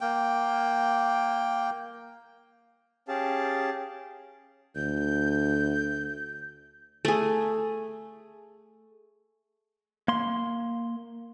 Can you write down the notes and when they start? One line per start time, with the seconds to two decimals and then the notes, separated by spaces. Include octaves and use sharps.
0.01 A#3 G5
3.08 C#4 G4 G#4 F5 A5
4.76 D2 G6
7.05 A3 G#4
10.08 A#3 C6